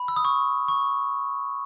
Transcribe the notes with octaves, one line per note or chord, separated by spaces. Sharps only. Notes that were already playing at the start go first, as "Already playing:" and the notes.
Already playing: B5
E6
D#6
C#6
C#6